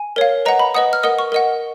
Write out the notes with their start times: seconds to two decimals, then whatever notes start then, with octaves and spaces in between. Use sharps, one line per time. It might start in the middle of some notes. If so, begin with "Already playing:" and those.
Already playing: G#5
0.16 A#4 C#5 F5
0.45 B4 D#5 F#5 A#5
0.59 B5
0.74 B4 D#5 F#5 D#6
0.93 F6
1.03 A#4 D#5 F#5 D#6
1.19 C#6
1.32 A#4 D#5 F#5